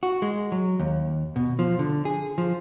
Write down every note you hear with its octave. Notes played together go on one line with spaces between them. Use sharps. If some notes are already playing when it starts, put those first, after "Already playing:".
F#4
G#3
F#3
D#2
B2
F3
D3
G#4
F3